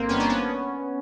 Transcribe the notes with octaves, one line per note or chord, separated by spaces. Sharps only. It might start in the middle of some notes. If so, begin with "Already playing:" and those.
Already playing: G1 A#3 C4
G2 D#3 B3 C#4
C4 D4
B3 C#4